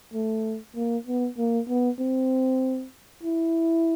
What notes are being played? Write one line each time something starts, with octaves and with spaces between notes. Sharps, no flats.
A3
A#3
B3
A#3
B3
C4
E4